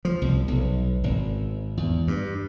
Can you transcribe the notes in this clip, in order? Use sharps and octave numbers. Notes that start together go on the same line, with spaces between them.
F3
C2
B1
G#1
E2
G2